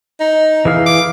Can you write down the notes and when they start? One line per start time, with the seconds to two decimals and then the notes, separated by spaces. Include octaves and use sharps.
0.20 D#4
0.65 E3 G#4 F5
0.86 D6